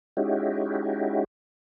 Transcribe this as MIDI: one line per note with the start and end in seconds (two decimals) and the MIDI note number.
0.17 1.24 56
0.17 1.24 61
0.17 1.24 63
0.17 1.24 64
0.17 1.24 66
0.17 1.24 67